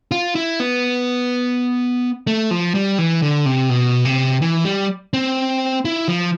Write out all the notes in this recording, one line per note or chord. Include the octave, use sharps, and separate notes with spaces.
F4
E4
B3
A3
F3
G3
E3
D3
C3
B2
C3
E3
G3
C4
E4
F3